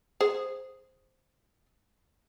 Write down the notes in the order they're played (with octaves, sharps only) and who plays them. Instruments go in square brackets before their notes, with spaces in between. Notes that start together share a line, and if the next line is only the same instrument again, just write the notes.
[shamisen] G#4 C5